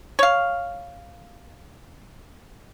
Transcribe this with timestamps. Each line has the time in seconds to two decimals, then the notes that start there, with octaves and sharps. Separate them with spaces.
0.19 C#5 F5